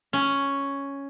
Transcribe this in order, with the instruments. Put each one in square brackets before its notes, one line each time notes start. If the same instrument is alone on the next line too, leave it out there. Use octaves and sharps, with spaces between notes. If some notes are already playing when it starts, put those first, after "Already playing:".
[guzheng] C#4